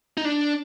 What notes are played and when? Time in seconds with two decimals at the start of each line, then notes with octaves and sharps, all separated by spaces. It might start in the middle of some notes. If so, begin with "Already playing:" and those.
0.17 D#4
0.25 D4